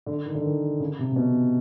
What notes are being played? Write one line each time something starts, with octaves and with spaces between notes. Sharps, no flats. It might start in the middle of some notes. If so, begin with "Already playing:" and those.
D3
D#3
D3
D#3
C#3
C3
C3
B2